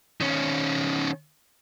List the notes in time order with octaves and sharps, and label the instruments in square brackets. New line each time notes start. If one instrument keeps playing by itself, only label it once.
[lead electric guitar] D#3 C#4